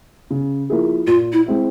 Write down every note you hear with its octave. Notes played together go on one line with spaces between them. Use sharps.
C#3
F3 A#3 E4 G#4
A#2 F4
E4
G#3 C4 E4